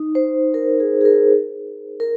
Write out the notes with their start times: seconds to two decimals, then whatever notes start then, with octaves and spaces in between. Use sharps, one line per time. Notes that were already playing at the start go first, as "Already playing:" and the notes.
Already playing: D#4
0.15 C5
0.54 A#4
0.80 G#4
1.01 G#4
1.05 A#4
2.00 A#4